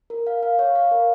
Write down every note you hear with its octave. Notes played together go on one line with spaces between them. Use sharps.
A#4
F5
F5
C#5
F5
A#4